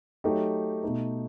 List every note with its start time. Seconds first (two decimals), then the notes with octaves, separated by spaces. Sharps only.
0.24 F#3 A3 D#4 G4
0.83 B2 A3 D#4